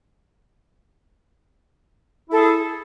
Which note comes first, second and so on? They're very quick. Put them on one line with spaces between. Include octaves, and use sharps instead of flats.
E4 A4 G#4